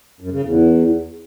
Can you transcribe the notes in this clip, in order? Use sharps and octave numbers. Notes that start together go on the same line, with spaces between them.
F#2
C#3
E2